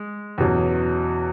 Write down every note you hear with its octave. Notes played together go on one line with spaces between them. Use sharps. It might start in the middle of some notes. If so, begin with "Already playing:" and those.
Already playing: G#3
E2 B2 F#3 C#4